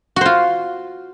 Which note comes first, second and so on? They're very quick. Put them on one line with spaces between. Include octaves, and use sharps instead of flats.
F#4 C5 F4